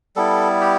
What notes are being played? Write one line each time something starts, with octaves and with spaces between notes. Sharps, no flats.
G3 B3 E4 A4
G4